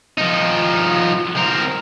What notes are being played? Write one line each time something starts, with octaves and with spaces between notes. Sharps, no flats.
F3 D#4
C4 A#4